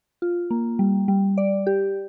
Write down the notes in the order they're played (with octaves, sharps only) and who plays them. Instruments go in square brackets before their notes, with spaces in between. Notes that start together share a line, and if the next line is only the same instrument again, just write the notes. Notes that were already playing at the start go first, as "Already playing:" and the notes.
[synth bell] F4
A#3
G3
G3
D5
G4